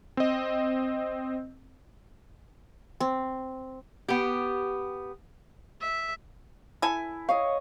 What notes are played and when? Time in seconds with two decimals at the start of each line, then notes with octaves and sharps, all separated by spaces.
0.17 C4 D#5
3.00 C4
4.08 B3 G4
5.81 E5
6.82 E4 A4 G#5
7.29 C#5 D#5 F5